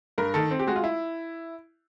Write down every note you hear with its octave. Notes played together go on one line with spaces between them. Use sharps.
G2 A#4
D#3 A4
C4
G4
G#3 F#4
F4
E4